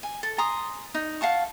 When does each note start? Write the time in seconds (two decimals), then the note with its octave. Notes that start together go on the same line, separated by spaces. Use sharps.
0.03 G#5
0.23 A4
0.38 G#5 A#5 C6 D#6
0.94 D#4
1.21 F5 F#5 A5 C#6